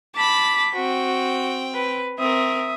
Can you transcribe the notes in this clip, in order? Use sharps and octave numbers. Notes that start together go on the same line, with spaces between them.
A5 B5 D6 B6
C4 F#4 G5
B4
C4 A#4 E5 D#6